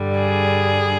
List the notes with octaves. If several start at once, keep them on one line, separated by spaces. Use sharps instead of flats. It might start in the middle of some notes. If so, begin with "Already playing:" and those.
Already playing: G2 D3 G3
G#4